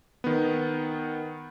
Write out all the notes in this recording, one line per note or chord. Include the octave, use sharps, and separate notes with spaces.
D#3 B3